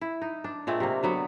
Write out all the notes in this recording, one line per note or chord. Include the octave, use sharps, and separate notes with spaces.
E4
D#4
D4
A#2 G#3 A3 C4
C3 A#3
D3 F#3 B3